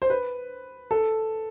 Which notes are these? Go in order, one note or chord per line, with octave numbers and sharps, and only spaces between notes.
C5
B4
A4